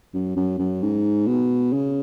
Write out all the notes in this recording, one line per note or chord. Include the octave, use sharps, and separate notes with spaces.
F#2
F#2
F#2
G#2
B2
C#3